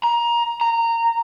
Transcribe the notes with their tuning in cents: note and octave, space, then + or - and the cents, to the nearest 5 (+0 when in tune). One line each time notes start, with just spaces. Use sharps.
A#5 +20
A#5 -15